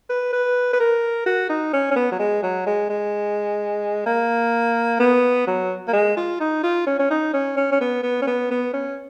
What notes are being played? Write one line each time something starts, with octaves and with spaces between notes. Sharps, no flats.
B4
B4
B4
A#4
F#4
D#4
C#4
C#4
B3
F#3
G#3
F#3
G#3
G#3
A#3
B3
F#3
A#3
G#3
F4
D#4
F4
C#4
C#4
D#4
C#4
C#4
C#4
B3
B3
C#4
B3
B3
C#4